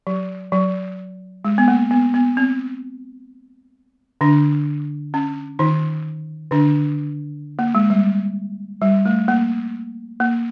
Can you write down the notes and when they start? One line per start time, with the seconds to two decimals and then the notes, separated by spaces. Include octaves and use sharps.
0.07 F#3
0.52 F#3
1.45 G#3
1.58 B3
1.68 A#3
1.91 B3
2.14 B3
2.37 C4
4.21 D3 D4
5.14 C#4
5.59 D#3 D#4
6.51 D3 D4
7.59 A#3
7.75 G#3
7.90 G3
8.82 G3
9.06 A3
9.28 A#3
10.20 A#3